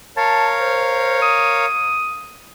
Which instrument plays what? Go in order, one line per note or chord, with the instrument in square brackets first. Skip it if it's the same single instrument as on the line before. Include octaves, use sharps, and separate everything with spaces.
[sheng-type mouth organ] A#4 C#5 F5 [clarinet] A5
[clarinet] C5
D#6